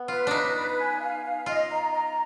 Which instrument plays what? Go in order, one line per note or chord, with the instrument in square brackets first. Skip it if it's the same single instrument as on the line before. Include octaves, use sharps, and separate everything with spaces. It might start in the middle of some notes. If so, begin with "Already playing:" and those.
Already playing: [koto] B3
[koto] F4 [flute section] B4
[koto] D4 D#4 [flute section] B4
[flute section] B4
G#5
F5
F5
[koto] F4 [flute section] D#5
[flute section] A#5
A#5